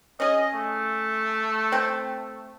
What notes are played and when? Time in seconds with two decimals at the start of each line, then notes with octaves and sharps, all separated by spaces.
0.20 C#4 G#4 D#5
0.55 A3
1.72 C4 G5 C6